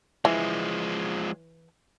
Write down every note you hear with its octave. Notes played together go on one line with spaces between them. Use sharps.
E3 F3 G#3